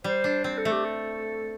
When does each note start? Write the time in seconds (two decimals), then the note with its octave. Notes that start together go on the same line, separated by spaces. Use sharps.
0.04 G3 C5
0.24 D4
0.44 C4 C5
0.58 A4
0.65 A3
0.72 G4
0.85 A4